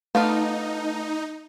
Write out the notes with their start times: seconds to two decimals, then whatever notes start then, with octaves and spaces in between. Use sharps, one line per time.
0.15 A3 B3 D4 D#4 F4 F5